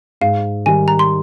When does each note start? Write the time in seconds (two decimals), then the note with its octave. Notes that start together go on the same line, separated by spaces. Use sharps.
0.21 G#2 F5
0.66 D#3 G3 G#5
0.88 A#5
0.99 C6